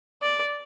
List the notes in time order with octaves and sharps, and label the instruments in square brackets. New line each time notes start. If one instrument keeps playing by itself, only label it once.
[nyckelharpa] D5